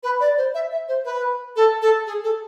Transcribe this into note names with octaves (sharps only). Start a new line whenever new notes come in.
B4
D5
C5
E5
E5
C5
B4
A4
A4
G#4
A4